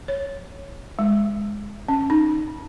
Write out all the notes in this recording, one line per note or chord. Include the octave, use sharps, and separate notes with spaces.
C#5
G#3
C#4
D#4